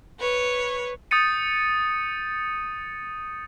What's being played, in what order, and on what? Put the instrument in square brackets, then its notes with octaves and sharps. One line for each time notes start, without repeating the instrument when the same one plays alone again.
[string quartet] B4 C#5
[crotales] D#6 G6 A6 C#7 D#7